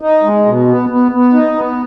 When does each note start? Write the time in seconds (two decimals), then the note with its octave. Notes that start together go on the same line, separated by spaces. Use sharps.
0.01 D#4
0.23 G#3
0.46 B2
0.68 B3
0.89 B3
1.12 B3
1.33 D#4
1.55 B3